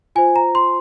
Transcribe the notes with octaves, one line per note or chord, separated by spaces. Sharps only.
F4 C5 G#5
A#5
C6